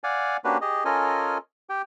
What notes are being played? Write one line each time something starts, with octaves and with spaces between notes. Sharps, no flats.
D5 F5 F#5 G#5
A#3 C#4 D4 F#4 G4 B4
G4 G#4 D#5
C#4 F4 A4 A#4 D#5 G#5
G4 G5